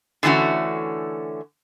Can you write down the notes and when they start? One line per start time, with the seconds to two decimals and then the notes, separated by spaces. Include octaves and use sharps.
0.23 D3 E3 A3 C#4 F#4